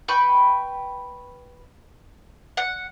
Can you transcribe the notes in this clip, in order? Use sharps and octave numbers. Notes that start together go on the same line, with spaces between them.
B4 G5 B5 C#6
F#5